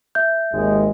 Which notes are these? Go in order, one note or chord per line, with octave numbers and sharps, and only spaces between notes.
E5 G6
G#1 D#2 G#3